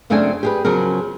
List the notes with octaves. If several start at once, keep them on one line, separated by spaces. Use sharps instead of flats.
F#2 C#3 A3 C4 D4 G#5
G4 G#4 B4
C#3 F3 F#3 G#4 A#4